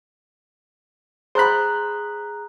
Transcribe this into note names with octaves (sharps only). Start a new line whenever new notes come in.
G#4 C5 A#5 B5 F#6